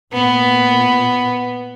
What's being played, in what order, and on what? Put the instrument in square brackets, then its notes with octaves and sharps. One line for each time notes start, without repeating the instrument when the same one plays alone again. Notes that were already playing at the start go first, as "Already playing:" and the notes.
[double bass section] A#2 [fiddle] B3